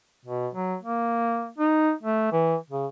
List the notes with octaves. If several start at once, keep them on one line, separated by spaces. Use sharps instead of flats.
B2
F#3
A#3
D#4
A3
E3
C#3